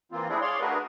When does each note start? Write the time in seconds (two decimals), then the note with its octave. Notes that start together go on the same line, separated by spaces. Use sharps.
0.12 E3 A#3 C4 F4
0.29 A3 C4 D4 E4 G#4
0.41 G#4 C#5 D5 F5 C6
0.60 A3 D4 F#4 G#4 A#4 B4